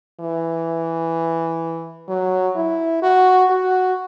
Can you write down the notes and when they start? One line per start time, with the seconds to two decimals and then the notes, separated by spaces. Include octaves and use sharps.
0.20 E3
2.08 F#3
2.56 E4
3.02 F#4
3.50 F#4